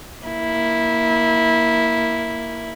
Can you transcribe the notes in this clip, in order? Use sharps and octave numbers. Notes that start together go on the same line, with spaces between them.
A#3 E4